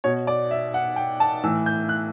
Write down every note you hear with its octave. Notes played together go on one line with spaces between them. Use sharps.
B2 C#5
D5
E5
F#5
G5
A5
A2 E3 E6
G6
F#6